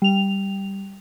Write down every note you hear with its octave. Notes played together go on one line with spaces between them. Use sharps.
G3 F7